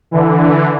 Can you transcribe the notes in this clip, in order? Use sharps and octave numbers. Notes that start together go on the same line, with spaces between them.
D3 E3